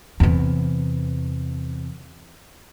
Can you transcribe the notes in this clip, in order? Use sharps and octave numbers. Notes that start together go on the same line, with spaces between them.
E2 C3